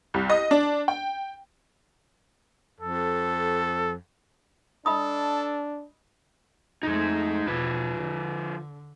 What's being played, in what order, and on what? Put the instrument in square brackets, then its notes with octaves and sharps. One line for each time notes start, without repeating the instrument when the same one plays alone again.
[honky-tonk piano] C2
D#5
D4
G5
[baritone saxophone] F2 [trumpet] A4
[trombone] D4 [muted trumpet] A4 [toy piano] D#5 B5 D#6
[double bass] F2 A3 [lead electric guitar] G#3 D#4
[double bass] E2 B2 [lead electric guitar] F3 B4
[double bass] D3